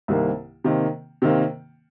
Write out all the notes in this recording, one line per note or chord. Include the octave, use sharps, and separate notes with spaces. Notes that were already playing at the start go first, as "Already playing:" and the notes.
C2 C3 D#3 A#3
C3 D#3 A#3
C3 D#3 A#3